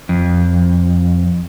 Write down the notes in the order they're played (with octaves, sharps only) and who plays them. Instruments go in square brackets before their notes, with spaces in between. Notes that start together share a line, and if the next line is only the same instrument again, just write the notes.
[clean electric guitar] F2